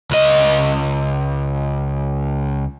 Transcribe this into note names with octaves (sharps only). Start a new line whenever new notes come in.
C#2 D#5